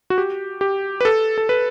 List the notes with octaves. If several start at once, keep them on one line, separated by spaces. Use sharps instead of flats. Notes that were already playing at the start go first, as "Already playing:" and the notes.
F#4
G4
G4
B4
A4
A4
B4